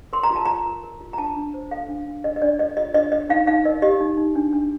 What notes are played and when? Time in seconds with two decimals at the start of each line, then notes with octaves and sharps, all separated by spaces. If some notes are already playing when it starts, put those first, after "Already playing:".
0.13 A#4 C6
0.23 A#5
0.31 F4
0.36 A5
0.45 F4 A#5
0.66 A#4
0.84 A#4
1.01 F4
1.13 A#5
1.18 D4 A5
1.36 D4
1.54 C5
1.71 A4 F5
1.88 D4
2.07 D4
2.24 D4 D#5
2.36 D#5
2.42 D4 D5
2.59 A4 D#5
2.77 F4 D#5
2.94 D4 D#5
3.12 D4 D#5
3.29 D#4 F5
3.47 D#4 F5
3.65 A#4 D#5
3.82 G4 D#5
4.00 D#4
4.17 D#4
4.35 D4
4.53 D4